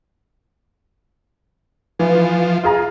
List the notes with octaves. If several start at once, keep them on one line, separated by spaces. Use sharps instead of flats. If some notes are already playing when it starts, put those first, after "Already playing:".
E3 F3
F4 G#4 A#5